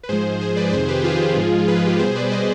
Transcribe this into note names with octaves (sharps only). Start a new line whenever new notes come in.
B4
G#2 F3 G#3 G#4 C5
G#4 C5
B4 D5
D5
F2 C3 D#3 G#4 C5
G4 B4
F4 G#4
G#2 F3 G#3
B4
G#4
G4 B4
B2 G3 G#4 C5
B4 D5
C5 D#5